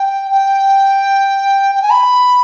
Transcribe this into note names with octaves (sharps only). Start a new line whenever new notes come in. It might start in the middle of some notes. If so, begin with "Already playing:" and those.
Already playing: G5
G5
G5
G#5
B5